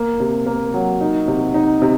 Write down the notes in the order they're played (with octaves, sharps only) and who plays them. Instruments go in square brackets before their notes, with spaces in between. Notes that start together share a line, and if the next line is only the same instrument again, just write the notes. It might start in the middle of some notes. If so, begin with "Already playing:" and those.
Already playing: [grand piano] A#3
C3
A#3
F#3
D#4
C3
D#4
C3